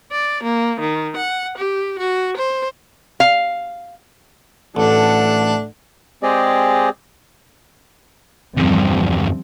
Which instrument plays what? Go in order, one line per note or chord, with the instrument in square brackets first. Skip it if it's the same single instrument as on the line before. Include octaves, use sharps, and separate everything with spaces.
[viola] D5
A#3
D#3
F#5
G4
F#4
C5
[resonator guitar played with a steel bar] F5
[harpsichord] A1 [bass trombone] A3 [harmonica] D4 [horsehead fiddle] A4 F#5
[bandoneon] G#3 C4 G4 G#4 D5 D#5
[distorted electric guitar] E2 G2 [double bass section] F3 G3 C4